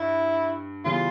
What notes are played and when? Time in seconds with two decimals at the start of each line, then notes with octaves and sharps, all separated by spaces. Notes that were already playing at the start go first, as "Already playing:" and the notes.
Already playing: G2 E4
0.85 C#3 E3 G3 B3 F4